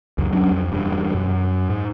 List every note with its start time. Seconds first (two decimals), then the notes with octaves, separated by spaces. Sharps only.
0.18 C#2 F#2
0.32 F#3 C#4 D4
0.51 F2
0.72 E1 G2
1.14 F#2
1.70 G#2